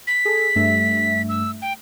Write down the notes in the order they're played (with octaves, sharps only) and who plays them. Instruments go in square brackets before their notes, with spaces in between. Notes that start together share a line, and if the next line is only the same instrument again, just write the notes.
[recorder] B6
[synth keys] G#4 A4
G2 A3 E5
[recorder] E6
G5